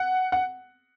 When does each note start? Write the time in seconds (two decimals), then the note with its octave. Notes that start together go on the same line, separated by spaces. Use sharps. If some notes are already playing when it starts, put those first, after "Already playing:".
Already playing: F#5
0.32 F#5